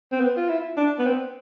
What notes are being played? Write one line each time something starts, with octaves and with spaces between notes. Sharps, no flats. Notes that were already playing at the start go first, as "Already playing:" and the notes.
C4
B3
F4
E4
D4
B3
C4